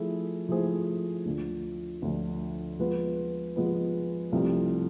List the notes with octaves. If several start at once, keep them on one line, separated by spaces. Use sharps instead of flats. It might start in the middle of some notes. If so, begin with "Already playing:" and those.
Already playing: F3 A3 E4 G#4
F3 A3 E4 G#4 C5
D2 D3 F3
D2 D3 F3
F3 G#3 B3 F4 B4
F3 G#3 B3 F4 B4
C2 C3 F3 A3